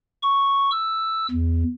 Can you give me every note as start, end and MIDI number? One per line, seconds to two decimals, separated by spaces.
0.23 0.70 85
0.71 1.27 88
1.31 1.64 40